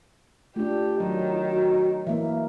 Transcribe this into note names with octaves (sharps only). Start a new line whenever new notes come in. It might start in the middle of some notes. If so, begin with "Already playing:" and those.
A3 D4 F4 G4
D#3 F#3
F#4
E3 A#3 E5